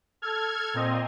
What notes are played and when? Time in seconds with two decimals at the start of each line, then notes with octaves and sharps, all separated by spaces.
0.22 A4 F6 G#6
0.74 A#2 C4 D#5